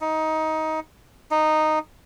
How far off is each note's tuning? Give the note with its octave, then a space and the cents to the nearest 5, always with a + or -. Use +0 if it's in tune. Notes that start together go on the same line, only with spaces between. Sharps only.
D#4 +15
D#4 -10